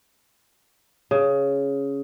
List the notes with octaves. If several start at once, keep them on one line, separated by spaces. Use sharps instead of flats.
C#3